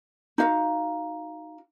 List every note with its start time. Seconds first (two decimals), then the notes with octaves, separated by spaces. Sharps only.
0.38 D#4 F#4 F5